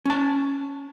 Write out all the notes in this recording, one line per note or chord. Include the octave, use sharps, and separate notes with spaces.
C#4 A5